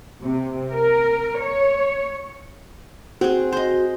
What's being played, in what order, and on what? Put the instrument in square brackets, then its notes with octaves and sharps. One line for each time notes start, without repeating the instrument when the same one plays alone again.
[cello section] C3
A#4
C#5
[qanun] C4 G#4 [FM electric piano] F#4
[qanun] C5 D#5